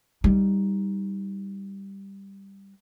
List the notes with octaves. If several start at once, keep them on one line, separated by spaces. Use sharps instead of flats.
G3 D#4